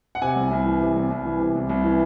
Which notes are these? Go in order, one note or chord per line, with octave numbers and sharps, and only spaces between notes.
F#5
C3 G#5
C2
C2
E3
C3
C2
C2
E3
C3
C2
C2
E3